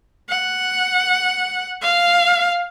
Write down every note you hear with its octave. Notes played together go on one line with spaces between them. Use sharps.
F#5
F5